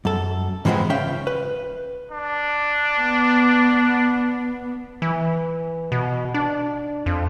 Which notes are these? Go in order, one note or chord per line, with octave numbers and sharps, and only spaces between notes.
F#2 A4
G#2 E3 F3 G#3 B3 C4
C#2 C#4 E5 F5 G5
B4
D4
B3
E3
B2
D4
F2